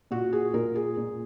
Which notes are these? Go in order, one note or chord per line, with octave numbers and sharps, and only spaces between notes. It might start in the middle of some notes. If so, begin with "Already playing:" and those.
A#2 F#4
G#4
A#2 A#4
G#4
A#2